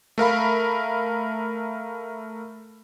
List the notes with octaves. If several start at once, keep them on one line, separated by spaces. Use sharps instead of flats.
A3 A#4 F5 B5